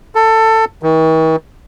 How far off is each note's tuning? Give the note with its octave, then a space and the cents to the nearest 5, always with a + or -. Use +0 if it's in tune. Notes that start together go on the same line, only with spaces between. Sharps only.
A4 +20
D#3 +45